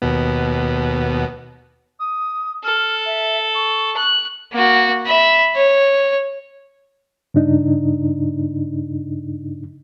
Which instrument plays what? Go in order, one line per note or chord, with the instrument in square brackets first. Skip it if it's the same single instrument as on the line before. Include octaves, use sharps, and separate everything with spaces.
[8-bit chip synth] D#2 B2 B3
[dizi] D#6
[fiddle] A4 [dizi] F6
[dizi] E5
C#6
[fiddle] F#6
A#3 F#4
E5 B5
C#5
[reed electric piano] G2 C#3 D4 D#4